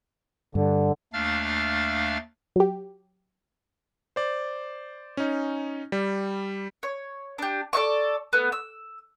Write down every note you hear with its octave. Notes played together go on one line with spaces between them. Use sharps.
G2 D3
D#2 A3 D4 F5 F6 A6
F#3 G4
C5 D5
C#4 D#4
G3
C#5
D4 G4
A4 D5 E5 C#6
A3 B3
E6